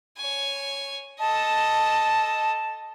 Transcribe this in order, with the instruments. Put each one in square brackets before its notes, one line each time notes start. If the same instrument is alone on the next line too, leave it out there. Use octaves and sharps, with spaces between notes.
[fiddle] C#5 G#5
[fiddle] A4 D#5 [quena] A5